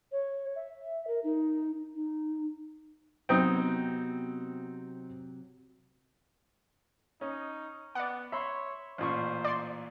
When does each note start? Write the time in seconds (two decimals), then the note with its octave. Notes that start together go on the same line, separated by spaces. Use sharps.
0.12 C#5
0.55 E5
1.07 A#4
1.24 D#4
1.95 D#4
3.29 C3 F#3 B3 C4 D#4 D#5
7.21 C#4 D#4
7.95 B3 D5 F#5
8.32 C#5 E5 B5 C6
8.98 A1 A#2 C5 C#6
9.44 D5 C6